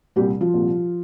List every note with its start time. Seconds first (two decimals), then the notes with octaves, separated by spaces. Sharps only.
0.16 C2 A#2 G3 G4
0.41 F3 F4
0.54 C2 A#2 G3